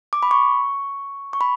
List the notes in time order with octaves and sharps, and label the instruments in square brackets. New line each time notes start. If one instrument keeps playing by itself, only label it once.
[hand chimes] D6
B5
C#6
C#6
B5